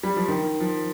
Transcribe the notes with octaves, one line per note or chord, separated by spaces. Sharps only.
G3
F3
D#3
F3